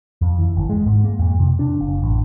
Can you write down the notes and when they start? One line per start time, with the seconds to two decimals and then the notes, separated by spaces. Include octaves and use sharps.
0.21 F2
0.39 E3
0.56 G1
0.69 G#3
0.86 G#2
1.04 A#3
1.19 F2
1.40 C3
1.59 D4
1.80 F#1
2.03 A1